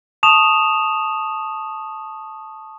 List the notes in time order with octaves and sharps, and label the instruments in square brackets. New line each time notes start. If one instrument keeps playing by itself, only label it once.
[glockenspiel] A5 C#6 D#6 E7 F7